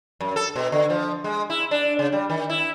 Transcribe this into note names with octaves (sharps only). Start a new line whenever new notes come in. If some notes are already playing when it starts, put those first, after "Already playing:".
F#2
A4
B2
D3
F3
G#3
E4
D4
C#3
G3
D#3
E4